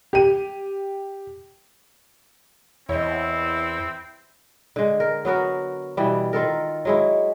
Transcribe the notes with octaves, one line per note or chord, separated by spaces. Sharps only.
G4 D#7
E2 C4 E4 C#5 D#5
D3 G#3
A#4
F#3 B3 F#4 A#4
B2 E3 G3
D#3 F4 A4 A#4
F#3 G#3 E4